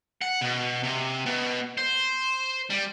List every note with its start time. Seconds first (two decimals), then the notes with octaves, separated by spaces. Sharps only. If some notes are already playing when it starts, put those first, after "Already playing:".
0.21 F#5
0.41 B2
0.83 C3
1.26 B2
1.78 C5
2.70 G3